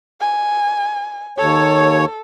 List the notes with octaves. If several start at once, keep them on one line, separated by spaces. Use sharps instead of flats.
G#5
D#2 A4 C#5